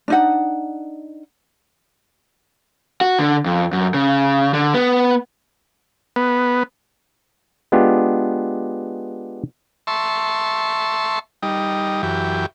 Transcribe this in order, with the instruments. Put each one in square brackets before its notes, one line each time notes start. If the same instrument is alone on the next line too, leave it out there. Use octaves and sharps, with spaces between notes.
[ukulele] D4 D#4 F#5
[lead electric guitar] F#4
D3
F2
F#2
C#3
D3
B3
[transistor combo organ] B3
[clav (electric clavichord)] G#3 B3 D4 F4 G4
[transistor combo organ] E5 A5 C6 C#6
G3 D#4
F#2 E3 G4